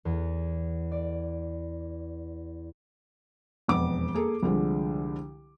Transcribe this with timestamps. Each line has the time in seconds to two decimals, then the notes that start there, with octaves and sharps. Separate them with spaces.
0.05 E2
0.91 D5
3.68 E1 F2 B3 D6
4.14 A#3 G#4 A4
4.43 C2 D3 F3 G#3